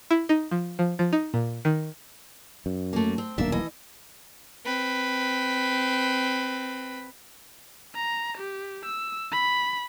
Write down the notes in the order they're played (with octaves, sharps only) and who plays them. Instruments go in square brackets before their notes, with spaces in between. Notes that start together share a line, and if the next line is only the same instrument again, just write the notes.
[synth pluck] E4
D#4
F3
F3
F3
D#4
A#2
D#3
[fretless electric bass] F#2
[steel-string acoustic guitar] A3 A#3
C4
[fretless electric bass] D#1 B1 A#3 [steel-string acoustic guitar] D4 E5
[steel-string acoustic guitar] E3 D#5
[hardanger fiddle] C4 B4
[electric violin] A#5
G4
E6
B5